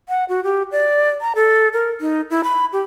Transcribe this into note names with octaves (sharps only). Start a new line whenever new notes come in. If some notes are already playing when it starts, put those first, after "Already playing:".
F#5
F#4
G4
D5
A#5
A4
A#4
D#4
E4
B5
G4